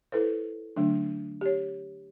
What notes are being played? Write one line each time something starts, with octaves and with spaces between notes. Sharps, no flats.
E4 A4 B4 C5
D3 F#3 A3 D4
G4 C#5